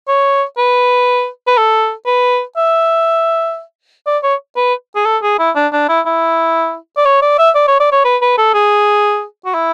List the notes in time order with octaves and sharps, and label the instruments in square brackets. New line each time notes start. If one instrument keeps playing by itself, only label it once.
[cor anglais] C#5
B4
B4
A4
B4
E5
D5
C#5
B4
G#4
A4
G#4
E4
D4
D4
E4
E4
D5
C#5
D5
E5
D5
C#5
D5
C#5
B4
B4
A4
G#4
F#4
E4